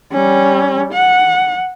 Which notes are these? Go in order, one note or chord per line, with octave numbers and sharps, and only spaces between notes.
G3 C#4
F#5